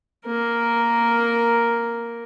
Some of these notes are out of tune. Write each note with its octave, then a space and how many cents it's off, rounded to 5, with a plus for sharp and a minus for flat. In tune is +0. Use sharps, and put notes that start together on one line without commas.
A#3 +0 A#4 +0